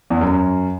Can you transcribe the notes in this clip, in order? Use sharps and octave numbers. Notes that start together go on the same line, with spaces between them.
E2
F#2